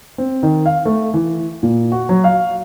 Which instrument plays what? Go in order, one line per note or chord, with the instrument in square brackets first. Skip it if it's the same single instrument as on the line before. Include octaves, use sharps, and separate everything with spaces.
[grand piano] C4
D#3
F5
A3
E3
A#2
F#4
F#3
F5